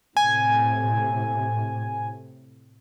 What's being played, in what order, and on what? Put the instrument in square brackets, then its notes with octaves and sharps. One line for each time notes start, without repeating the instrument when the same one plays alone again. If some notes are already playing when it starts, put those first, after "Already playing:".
[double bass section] A2 C3 [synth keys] G#5